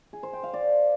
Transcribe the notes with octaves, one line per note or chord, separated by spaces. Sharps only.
G#4
C5
G5
F5
D5